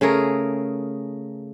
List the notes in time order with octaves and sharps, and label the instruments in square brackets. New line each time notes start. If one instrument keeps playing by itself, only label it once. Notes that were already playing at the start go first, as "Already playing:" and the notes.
[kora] C#3 A3 G#4 A#4